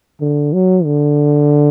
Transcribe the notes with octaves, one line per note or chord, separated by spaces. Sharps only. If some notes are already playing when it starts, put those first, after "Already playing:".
D3
F#3
D3